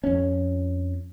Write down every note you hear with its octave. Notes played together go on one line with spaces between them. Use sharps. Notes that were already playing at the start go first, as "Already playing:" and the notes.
F2 C#4